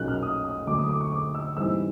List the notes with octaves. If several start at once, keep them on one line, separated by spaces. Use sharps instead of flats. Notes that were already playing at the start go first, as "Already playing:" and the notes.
Already playing: B1 A#2 F#3 A#3 C#4 F#6
F6
D#6
D#6
D2 D3 F#3 D6
D#6
D6
C#6
D6
E6
G#2 E3 G3 C4 E6